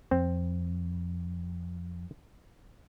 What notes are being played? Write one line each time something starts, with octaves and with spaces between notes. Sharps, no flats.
F2 C4